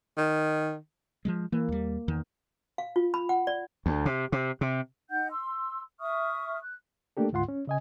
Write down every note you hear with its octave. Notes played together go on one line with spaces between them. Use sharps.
D#3
F3 G3 G#3
E3 A#3
D#2 G3
E2 D#3
F5
F4
B5
F#5
D5
D2
C3
C3
C3
D#4 F#5 G6
C6 E6
E5 C#6 D#6 F6
F#6
A3 A#3 D4 G4 A4
D2 G#2 F4 F#5 C6
C#4
C#3 D#5 G#5